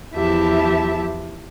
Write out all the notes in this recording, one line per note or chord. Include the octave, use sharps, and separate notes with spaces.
E2 F3 E4 G4 E5 A5